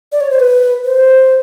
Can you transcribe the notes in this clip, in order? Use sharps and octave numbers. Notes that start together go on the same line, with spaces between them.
D5
C#5
C5
B4
C5